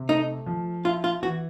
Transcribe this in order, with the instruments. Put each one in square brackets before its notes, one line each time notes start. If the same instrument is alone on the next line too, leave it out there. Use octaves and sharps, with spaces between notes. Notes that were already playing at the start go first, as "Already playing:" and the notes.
Already playing: [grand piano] C3
[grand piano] A3 [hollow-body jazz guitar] D#4
[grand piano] F3
[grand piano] E4 [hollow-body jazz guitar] F4
[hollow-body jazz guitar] F4
[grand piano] E3 [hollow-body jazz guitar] F#4